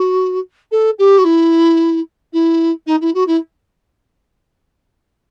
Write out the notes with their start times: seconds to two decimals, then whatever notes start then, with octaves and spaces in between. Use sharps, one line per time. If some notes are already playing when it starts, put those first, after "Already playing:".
Already playing: F#4
0.71 A4
0.99 G4
1.18 F#4
1.24 E4
2.33 E4
2.86 D#4
3.01 E4
3.14 F#4
3.27 E4